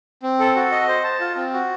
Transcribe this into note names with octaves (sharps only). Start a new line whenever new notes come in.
C4
A4
F#4
D#5
C5
A5
F4
C4
F#4